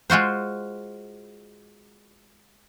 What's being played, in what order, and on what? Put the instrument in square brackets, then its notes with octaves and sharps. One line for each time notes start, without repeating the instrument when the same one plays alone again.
[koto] G#3 F4 F#4 C5